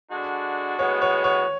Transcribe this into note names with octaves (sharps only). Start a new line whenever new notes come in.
D3 G#3 D4 F#4
A2 G#3 B3 F#4 C#5
C#5
C#5